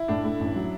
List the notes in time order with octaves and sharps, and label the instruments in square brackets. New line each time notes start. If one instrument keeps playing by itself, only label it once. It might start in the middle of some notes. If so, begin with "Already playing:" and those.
Already playing: [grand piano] E4
[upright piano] A2 [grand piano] D4
[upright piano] A3
A1
F#3